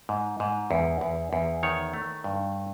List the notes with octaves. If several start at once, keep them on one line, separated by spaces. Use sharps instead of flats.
G#2
G#2
E2
E2
E2
D#3 C#5
A3
G2